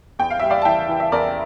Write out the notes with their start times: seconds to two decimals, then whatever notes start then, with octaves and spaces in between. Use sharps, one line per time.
0.19 E2 G5
0.30 F5
0.40 G3 E5
0.50 D5 F5
0.62 A5
0.65 E3 E5 G5
0.88 E3
1.00 E5
1.12 E2 A#4 D5